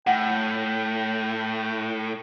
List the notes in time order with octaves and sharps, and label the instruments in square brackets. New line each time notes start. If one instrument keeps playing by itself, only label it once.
[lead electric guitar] A2 [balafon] F#5 [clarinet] G5